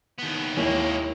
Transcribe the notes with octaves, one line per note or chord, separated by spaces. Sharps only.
D#2 B3
D#2 G#3 A#3 E4 C#5